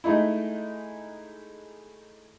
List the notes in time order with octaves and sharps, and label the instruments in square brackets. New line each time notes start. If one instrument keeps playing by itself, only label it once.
[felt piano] G#3 A3 D#4 E4